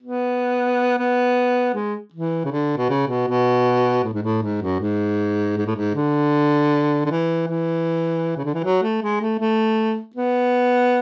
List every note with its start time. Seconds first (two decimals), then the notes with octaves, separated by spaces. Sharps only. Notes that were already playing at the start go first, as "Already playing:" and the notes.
0.03 B3
0.98 B3
1.75 G#3
2.14 E3
2.45 C#3
2.52 D3
2.77 B2
2.90 C#3
3.08 B2
3.28 B2
4.04 A2
4.14 G#2
4.23 A2
4.42 G#2
4.62 F#2
4.80 G#2
5.58 G#2
5.67 A2
5.76 G#2
5.95 D3
7.06 D3
7.11 E3
7.48 E3
8.37 C#3
8.45 D3
8.54 E3
8.64 F#3
8.83 A3
9.02 G#3
9.21 A3
9.40 A3
10.16 B3